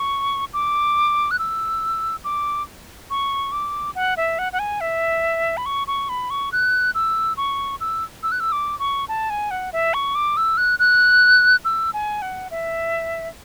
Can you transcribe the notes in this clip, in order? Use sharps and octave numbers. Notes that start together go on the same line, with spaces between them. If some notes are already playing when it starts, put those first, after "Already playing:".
Already playing: C#6
D6
F#6
E6
D6
C#6
D6
F#5
E5
F#5
F#5
G#5
E5
B5
C#6
C#6
B5
C#6
F#6
E6
C#6
E6
E6
F#6
E6
D6
C#6
A5
G#5
F#5
E5
C#6
D6
E6
F#6
F#6
E6
G#5
F#5
E5